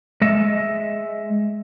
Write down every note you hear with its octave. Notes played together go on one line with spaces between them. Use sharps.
G#3 D#5 E5